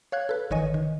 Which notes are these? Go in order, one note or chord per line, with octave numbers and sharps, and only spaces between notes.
C#5 F5 F#6 G#6
A4 B4
G1 D#3 E3 C#5 D#5 G#5
D#3